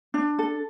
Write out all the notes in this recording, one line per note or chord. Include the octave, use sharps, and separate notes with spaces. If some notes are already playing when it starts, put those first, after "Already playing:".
D4
A4